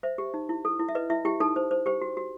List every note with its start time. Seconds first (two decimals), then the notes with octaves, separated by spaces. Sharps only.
0.03 C5 E5
0.18 G4
0.34 D#4
0.49 E4
0.65 A4
0.79 E4
0.89 E5
0.95 B4 D#5
1.10 E4 E5
1.25 E4 G4 G5
1.40 D#4 A4 A5
1.56 C5
1.71 C5
1.86 G4 C5 G5
2.02 F#4
2.17 F#4